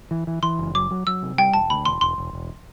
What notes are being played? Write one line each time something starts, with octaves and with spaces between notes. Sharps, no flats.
E3
E3
E3 C6
F#1
F#3 D6
F#3
F#3 E6
C3
G3 G5
E1 A5
D2 B5
E1 C6
E1 C6
E1
E1